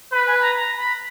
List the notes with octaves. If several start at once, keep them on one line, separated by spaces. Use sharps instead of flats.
B4 B5
G#5
B5
A#5
A#5
B5